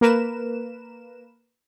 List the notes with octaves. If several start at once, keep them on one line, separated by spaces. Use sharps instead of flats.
A#3 A#4 B4 E7